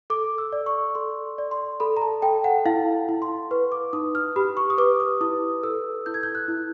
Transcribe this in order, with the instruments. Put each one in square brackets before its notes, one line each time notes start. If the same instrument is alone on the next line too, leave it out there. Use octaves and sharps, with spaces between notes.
[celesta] A4 D6
E6
D5
C#6
A4 C6
D5
C6
A4 B5
A#5
A5
A4 G5
F#5
E4 F5
E4
C6
B4 C#6
D6
D#4 D#6
F6
G4 B5
C#6
D#6
B4 D6
D#6
E4 D#6
A4 E6
E4 G6
G#6
G6
F#6
E4